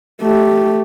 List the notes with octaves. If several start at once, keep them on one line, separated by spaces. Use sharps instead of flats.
A3 G4